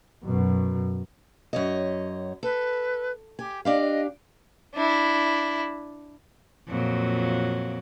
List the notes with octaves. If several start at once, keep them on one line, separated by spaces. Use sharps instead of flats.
F#2 B2
F#2 C#5 D#5
A4 B4
G4 G#5
D4 G4 D#5 F5
D4 E4
F2 A#2 F#3